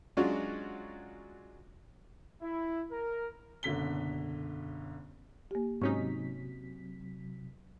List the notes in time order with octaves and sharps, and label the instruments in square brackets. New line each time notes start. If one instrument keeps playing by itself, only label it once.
[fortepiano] F#3 G#3 C#4 D4 F4 F#4
[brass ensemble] E4
A#4
[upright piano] F#1 B1 D3 B6 G7
[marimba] A#3 G4
[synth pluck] G#2 C#4 D#4 [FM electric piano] C3 F#3 B6 [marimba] C#6